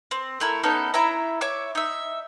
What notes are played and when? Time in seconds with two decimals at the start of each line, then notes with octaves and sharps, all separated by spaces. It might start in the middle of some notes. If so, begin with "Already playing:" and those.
0.11 C4
0.40 A3 E4 A#4
0.63 B3 C#4 D#4 A4
0.94 E4 C#5 E5 A#5
1.41 C#5 E5 D6
1.75 D#4 E5